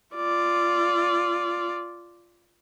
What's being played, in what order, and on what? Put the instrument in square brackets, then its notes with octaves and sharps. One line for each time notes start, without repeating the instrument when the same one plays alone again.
[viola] F4 D5